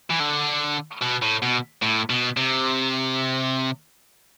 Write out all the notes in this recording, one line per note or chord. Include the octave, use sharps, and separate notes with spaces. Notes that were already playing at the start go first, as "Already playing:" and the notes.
E3
D3
B2
A2
B2
A2
B2
C3